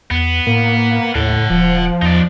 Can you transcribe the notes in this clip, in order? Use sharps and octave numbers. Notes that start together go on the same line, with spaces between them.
E2 B3
A2 A#3
D#2 A2 F#5 A5
D#1 F3
E2 D#4 D5